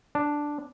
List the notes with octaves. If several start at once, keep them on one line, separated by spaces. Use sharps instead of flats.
D4